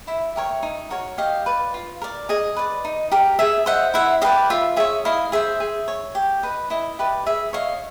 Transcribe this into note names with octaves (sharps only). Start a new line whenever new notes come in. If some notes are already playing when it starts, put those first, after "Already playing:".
E4 E5
G4 A#4 C#5
D#4
F#4 A#4 C#5
G4 D#5 F5
B4 D5
F4
A#4 D5
G#4 D#5
B4 D5
D#4
G4 A#4
G#4 E5
C5 D#5 E5 F#5
E4 E5 F#5
G4 B4 D5 D#5 F5
F4 E5
G#4 C#5 E5
E4 D#5 F5
G#4 C5 E5
G#4
C#5
G4
B4 D#5
E4 D#5
G4 B4 D5
G#4 E5
C#5 D#5 F5